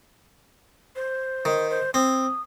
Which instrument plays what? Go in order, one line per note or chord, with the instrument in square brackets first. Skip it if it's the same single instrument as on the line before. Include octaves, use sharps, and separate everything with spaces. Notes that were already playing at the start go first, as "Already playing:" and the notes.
[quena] C5
[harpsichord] D#3
[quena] C5
[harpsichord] C4 [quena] D#6